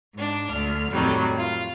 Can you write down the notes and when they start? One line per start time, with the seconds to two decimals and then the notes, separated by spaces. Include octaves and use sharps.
0.13 G#2 D4
0.50 D2 F6
0.92 F2 A2 D#3 F#3 G3
1.37 F4